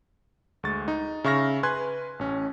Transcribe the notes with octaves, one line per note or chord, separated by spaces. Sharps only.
D2 G#3 C#6 A6
D#4
C#3 E5 C#6 F6 A#6
B4 G#5 C6 F#6 G#6
A1 C#4